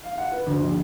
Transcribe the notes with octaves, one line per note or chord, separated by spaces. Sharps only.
F5
F#5
B4
D2
A#1